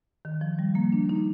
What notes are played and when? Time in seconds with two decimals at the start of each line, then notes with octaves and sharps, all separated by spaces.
0.25 D#3
0.41 F3
0.59 G3
0.75 A#3
0.92 D4
1.09 D#4